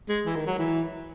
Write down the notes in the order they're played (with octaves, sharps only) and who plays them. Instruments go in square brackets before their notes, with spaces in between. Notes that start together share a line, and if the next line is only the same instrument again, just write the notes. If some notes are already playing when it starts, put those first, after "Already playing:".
[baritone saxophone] G#3
E3
D#3
F#3
E3